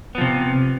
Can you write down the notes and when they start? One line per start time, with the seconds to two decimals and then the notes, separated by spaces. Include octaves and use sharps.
0.15 B3
0.18 F3
0.21 C3